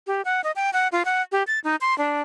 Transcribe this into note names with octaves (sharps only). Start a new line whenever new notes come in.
G4
F#5
D#5
G5
F#5
F4
F#5
G4
A6
D#4
C6
D4